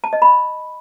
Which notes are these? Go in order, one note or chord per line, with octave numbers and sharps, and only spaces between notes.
A5
D#5
B5